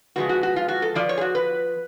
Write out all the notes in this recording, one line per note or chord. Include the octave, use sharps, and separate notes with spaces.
C#3 F3 G#3 B3 F#4
F#4
F#4
F4
F#4
A4
F3 B3 F4 D5
C#5
G#4
F#4
B4